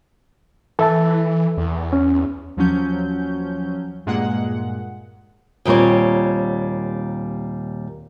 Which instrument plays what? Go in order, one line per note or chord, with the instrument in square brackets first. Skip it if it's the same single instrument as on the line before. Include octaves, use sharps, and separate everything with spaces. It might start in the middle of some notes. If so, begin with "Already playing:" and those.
[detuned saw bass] E3 [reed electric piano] A4 E5 A5
[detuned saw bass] E2
[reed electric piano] C#4
[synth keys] D#2 F3 F#3 C#4 G6
G2 A#2 G#3 A#3 F#5
[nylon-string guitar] D#2 A#2 G3 C4 C#5